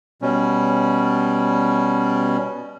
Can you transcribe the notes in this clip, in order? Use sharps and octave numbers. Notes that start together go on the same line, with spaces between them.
B2 G3 C#4